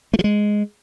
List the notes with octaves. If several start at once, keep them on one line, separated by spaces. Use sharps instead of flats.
A3
F3
G#3